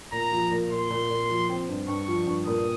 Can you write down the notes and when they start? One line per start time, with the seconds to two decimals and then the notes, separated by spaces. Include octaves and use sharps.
0.12 A#2 A#5
0.32 F3
0.51 A#2
0.71 A#2 C6
0.90 A#2
1.10 A#2
1.29 F3
1.49 C4
1.69 G2
1.88 G2 C#6
2.08 F3
2.27 G2
2.46 A#2 D#6